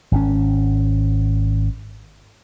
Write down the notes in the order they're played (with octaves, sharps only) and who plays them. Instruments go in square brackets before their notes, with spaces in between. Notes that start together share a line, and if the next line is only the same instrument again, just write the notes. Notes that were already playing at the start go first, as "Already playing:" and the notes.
[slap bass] G#1 B2 C#4